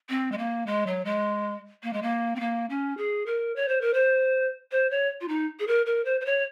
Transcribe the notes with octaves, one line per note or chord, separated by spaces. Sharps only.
C4
G#3
A#3
G#3
F#3
G#3
A#3
G#3
A#3
C4
A#3
C#4
G#4
A#4
C#5
C5
A#4
C5
C5
C#5
F4
D#4
G#4
A#4
A#4
C5
C5
C#5